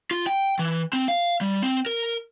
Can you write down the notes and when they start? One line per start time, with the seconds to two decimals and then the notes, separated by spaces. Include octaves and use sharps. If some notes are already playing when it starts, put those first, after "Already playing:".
0.11 F4
0.27 G5
0.59 E3
0.93 C4
1.08 F5
1.41 G3
1.62 C4
1.86 A#4